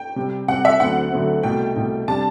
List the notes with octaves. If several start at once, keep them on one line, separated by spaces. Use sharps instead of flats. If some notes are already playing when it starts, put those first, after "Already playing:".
Already playing: G5
C3 G3 C4
C3 G3 C4 F#5
E5
D2 D3 F#3 A3 C4 F#5
D2 D3 F#3 A3 C4
C2 B2 A3 G5
C2 B2 A3
C3 G3 D4 A5